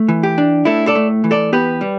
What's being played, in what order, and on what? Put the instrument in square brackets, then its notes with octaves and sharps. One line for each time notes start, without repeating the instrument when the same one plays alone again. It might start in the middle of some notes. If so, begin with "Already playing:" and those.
Already playing: [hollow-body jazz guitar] A3
E3
G4
D4
A2 E4 A4
A4 D5
A3
E3
A4 D5
B3 G4 B4
G3